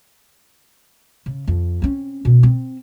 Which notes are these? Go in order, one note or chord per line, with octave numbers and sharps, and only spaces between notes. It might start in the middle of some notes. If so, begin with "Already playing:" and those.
C#3
F2
C4 C#4
B2 C#4
C4